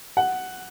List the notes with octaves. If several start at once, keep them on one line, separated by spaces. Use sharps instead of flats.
F#5